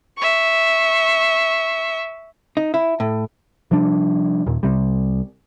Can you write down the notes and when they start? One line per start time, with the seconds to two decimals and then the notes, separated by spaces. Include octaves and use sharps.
0.17 E5 C#6
2.57 D#4
2.74 E4
3.00 A2
3.71 C3 F3 G3 D4
4.46 D#2 A#2
4.63 C2 C3 G3